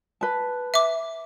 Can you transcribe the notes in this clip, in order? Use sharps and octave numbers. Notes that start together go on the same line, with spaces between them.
B4 A5
E5 D6